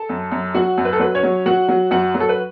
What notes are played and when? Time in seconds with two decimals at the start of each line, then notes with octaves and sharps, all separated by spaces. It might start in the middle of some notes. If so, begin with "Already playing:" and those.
Already playing: A4 A5
0.09 F#2
0.32 F#2
0.55 F#3 F#4 F#5
0.78 F#2
0.85 B4
0.93 A4
0.99 F#3 B4
1.15 C#4 C#5
1.23 F#3
1.46 F#3 F#4 F#5
1.68 F#3
1.91 F#2 F#4 F#5
2.14 F#3
2.20 A4
2.29 B4